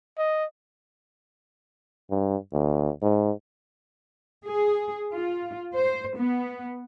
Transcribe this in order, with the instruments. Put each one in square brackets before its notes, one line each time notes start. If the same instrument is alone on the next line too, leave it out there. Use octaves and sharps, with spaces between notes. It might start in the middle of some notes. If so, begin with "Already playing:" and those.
[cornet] D#5
[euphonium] G2
D2
G#2
[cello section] G#4
F4
C5
B3